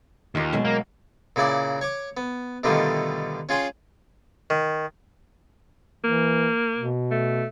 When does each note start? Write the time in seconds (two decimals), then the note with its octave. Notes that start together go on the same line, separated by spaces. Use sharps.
0.35 D#2 D#4 F4
0.53 B2 F#3 G#3
0.65 A#3
1.36 A#2 C#3 E4 D5 D6
1.81 C#5 C#6 D6
2.17 B3
2.64 B2 D3 D#3 G3 A3 F4
3.49 C#4 F4 G#4 G5 C6
4.50 D#3
6.04 E3 A#3
6.78 B2
7.11 A3